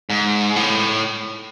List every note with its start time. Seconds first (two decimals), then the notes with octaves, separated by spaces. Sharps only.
0.10 G#2
0.56 A2